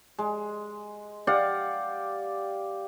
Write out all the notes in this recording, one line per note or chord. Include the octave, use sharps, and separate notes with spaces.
G#3
G4 D5 F5 F#5